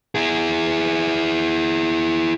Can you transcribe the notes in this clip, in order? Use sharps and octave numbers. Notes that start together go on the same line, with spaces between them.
E4 G#4